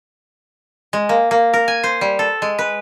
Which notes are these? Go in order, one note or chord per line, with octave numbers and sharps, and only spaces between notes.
G#3
A#3
A#3
A#4
G#5
C5
G3
A4
G#3
B4